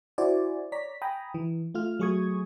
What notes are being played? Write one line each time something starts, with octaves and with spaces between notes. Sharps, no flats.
E4 F#4 C5 D5 G#5
C#5 D5 A#5 B6
G5 G#5 A#5 B5 D#6
E3
A3 F4 F6
F#3 A3 G#4 C#6 D#6 G#6